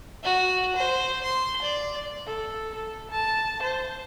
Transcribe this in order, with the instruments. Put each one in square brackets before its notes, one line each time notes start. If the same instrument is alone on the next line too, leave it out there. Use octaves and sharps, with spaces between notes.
[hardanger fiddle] F#4
C5
C6
D5
[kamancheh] A4
A4
A5
C5